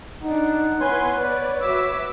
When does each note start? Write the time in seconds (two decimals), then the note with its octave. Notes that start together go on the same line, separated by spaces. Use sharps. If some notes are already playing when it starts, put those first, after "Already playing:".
0.23 D4 D#4 F#5
0.81 B3 E4 B4 C#5 G#5 C6
1.20 B4 D5
1.61 F#4 B4 E5 D6 E6